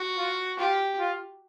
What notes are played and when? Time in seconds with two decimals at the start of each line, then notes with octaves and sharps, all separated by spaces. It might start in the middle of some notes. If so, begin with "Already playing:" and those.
Already playing: F#4
0.17 F4
0.58 F4 G4
0.99 F4